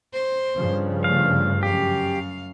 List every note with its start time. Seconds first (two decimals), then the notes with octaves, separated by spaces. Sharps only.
0.13 C5
0.55 G2 C#3 F3
1.04 A3 F5
1.63 F#2 G4 F5